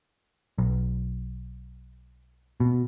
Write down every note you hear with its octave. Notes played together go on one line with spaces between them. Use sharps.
B1
B2